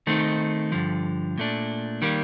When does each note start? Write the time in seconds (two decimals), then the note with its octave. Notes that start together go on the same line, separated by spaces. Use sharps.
0.07 D#3 A3 C4 D#4
0.72 G2 D3 F3
1.38 A#2 A3 D4
2.02 D#3 G3 A#3